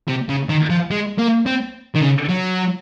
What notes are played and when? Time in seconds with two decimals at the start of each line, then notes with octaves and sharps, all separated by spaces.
0.08 C3
0.29 C#3
0.49 D#3
0.70 F3
0.91 G#3
1.18 A#3
1.46 C4
1.95 D#3
2.01 C#3
2.29 F#3